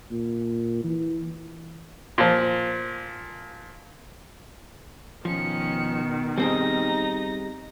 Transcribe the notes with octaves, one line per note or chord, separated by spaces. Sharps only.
A#2
E3
A#2 F3
B2 D#3 F3 C#4 C#7
G3 C4 D#4 G#4 A#6